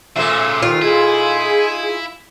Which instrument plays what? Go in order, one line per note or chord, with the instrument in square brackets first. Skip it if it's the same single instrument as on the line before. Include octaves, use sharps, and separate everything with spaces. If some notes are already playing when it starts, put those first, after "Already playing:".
[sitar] A#2 A3 [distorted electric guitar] C#3 C5 [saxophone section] E5
[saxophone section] C3 D#3 [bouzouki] F4
[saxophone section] D#4 G#4 [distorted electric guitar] E4